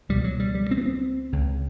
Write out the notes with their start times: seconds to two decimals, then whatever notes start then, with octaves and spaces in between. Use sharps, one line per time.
0.09 C#2 B2 G3
0.24 F#3
0.40 G3
0.55 G3
0.71 C4
0.77 B3
0.86 C4
1.32 C#2 C#3